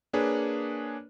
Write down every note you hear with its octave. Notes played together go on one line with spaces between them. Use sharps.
A#3 D4 G#4 B4 C#5